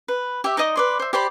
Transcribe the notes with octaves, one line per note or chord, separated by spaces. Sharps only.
B4
G4 E5
D#4 D5 D#5 D#6
B4 D5 C6
C5 E5
G4 C5 D5 B5